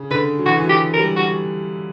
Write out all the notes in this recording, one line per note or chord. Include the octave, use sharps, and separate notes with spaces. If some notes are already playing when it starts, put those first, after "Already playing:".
Already playing: C#3
D3 B4
F#3
E3 F#4
E3
F#3
G4
A#4
G3
F#4